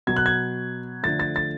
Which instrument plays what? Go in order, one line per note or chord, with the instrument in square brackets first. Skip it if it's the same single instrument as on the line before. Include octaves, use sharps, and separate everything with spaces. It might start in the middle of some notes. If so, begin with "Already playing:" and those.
[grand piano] B2 F#3 B3 G#6
F#6
G#6
D3 F3 A3 A6
A6
A6